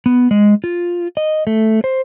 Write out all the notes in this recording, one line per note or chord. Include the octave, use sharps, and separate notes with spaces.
B3
G#3
F4
D#5
A3
C5